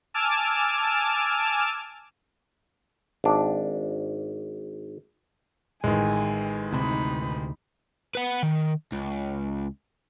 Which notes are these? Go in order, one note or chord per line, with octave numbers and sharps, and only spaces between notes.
G#5 A5 D6 E6 F6
G#1 D4
A1 D#3 G#3 G#5
D2 C3 D#4 B5
B4 F#5
D#3
C#2